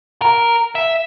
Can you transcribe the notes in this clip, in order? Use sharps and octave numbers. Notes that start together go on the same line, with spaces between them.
A#4
E5